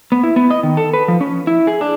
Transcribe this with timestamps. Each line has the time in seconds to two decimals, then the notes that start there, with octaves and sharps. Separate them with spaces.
0.12 B3
0.24 E4
0.36 B3
0.51 D#5
0.63 D#3
0.77 A4
0.93 B4
1.08 F3
1.21 C#4
1.47 E4
1.67 G#4
1.81 D4